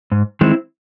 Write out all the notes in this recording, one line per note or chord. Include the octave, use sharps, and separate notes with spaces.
G#2
D#3 G#3 C4 E4